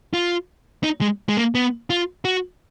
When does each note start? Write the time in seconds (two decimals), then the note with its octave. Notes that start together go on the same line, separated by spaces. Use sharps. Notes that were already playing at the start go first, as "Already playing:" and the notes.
0.14 F4
0.84 D#4
1.01 G#3
1.29 G#3
1.37 A#3
1.55 B3
1.90 F4
2.25 F#4